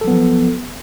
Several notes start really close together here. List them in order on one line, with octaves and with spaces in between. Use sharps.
A4 F#3 B3 F3